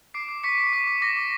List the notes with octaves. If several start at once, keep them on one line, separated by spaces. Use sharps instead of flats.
D6 C7 D7
D6
C#6 B6 C#7
C#6
D6 B6
D6
D6 A#6
D6